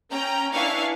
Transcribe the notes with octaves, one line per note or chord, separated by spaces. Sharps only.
C#4 G5 A#5
D4 E4 B4 F5 G#5 C#6